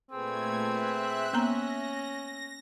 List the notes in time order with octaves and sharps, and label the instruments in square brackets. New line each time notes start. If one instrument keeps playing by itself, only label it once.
[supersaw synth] A#2 A3 G#6 [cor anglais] C4 [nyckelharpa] G#4 B4
[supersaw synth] E5 F#6
[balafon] A#3 B3 A#5 [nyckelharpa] C#4 [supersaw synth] A#6